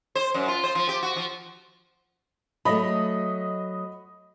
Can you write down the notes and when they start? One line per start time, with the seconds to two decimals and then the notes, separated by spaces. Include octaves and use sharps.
0.15 C5
0.34 F#2
0.48 F4
0.64 C5
0.75 F3
0.89 G4
1.03 F#4
1.16 F3
2.65 F#3 A3 D#5 B5